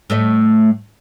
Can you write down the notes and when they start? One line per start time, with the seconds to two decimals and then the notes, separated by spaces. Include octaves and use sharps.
0.10 A2 A3 D#5